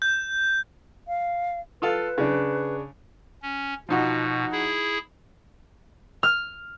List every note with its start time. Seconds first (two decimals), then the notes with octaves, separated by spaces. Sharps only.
0.02 G6
1.08 F5
1.82 F4 A4 B4 F5
2.18 C#3 D4
3.43 C#4
3.89 B2 F3 D#4 F#4
4.52 E4 G#4
6.23 F6